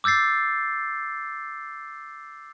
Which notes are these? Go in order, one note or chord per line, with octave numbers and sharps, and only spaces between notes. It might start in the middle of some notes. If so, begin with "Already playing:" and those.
D6 E6 G6 A6 C7